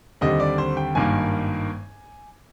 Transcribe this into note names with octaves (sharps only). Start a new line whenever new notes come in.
D#2 D3 G3 C4 D#5
D5
C5
G5
G#1 G2 D#3 A#3 G#5